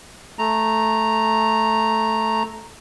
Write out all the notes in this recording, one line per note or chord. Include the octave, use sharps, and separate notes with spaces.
A3 A#5